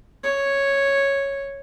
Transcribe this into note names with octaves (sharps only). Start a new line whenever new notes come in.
C#5